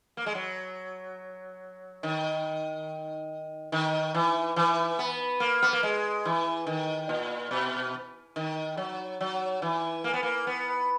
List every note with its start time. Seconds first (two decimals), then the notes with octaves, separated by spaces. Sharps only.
0.17 A#3
0.26 G#3
0.35 F#3
2.03 D#3
3.72 D#3
4.14 E3
4.56 E3
4.99 B3
5.40 A#3
5.63 B3
5.73 A#3
5.83 G#3
6.25 E3
6.66 D#3
7.09 A#2
7.51 B2
8.36 D#3
8.77 F#3
9.21 F#3
9.62 E3
10.04 A#3
10.14 B3
10.23 A#3
10.47 B3